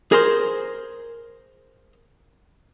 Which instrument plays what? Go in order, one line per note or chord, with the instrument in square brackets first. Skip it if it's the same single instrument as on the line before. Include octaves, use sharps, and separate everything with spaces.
[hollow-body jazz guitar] G#4 A#4 C5